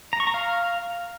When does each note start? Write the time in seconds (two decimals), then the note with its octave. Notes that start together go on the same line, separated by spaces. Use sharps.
0.13 A#5
0.20 C#6
0.27 A#5
0.34 F5